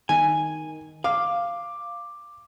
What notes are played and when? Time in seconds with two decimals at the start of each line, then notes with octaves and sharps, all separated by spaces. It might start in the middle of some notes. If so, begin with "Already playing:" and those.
0.09 D#3 G#5
1.04 F5 D6